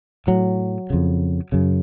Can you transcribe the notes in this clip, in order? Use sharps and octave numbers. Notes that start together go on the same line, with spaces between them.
A2 F#3
F2 C#3
F#2 C#3